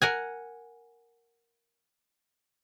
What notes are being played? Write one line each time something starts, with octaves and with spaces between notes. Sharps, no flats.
A#4 F#5 G#5